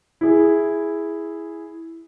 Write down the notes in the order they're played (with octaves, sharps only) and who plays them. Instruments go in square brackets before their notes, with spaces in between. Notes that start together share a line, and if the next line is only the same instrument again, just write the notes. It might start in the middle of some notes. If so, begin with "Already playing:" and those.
[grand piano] E4 G#4